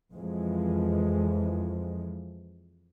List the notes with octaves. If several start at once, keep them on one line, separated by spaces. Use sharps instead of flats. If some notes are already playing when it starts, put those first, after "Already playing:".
F2 E3 F3 G#3